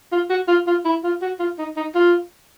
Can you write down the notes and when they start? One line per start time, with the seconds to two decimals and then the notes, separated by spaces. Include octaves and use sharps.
0.12 F4
0.30 F#4
0.48 F4
0.67 F4
0.85 E4
1.04 F4
1.22 F#4
1.39 F4
1.58 D#4
1.77 D#4
1.95 F4